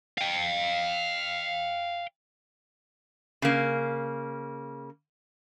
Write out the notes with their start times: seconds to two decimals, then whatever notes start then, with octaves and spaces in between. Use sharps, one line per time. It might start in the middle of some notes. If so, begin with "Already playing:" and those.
0.18 F5 G5
3.42 C#3 A#3